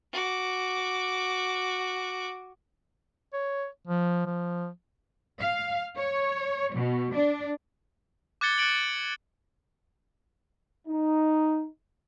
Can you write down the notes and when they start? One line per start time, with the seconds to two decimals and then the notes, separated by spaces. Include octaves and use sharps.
0.13 F#4 D6
3.33 C#5
3.87 F3
4.26 F3
5.40 F5
5.97 C#5
6.75 B2
7.13 D4
8.41 D6 F#6 G#6 A6 C#7 G7
8.58 F#6 A6 C#7 D7 F#7
10.88 D#4